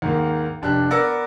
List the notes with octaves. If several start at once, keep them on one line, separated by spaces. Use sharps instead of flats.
D#2 G#2 D#3 A#3
F1 D4 G4 F#6
B3 A#4 D5 E6 A#6 C#7